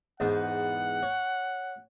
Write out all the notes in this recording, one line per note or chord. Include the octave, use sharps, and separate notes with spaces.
E2 G#2 B3 F#5
C#5